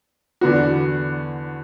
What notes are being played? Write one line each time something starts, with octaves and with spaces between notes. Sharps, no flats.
E2 D3 B3 F#4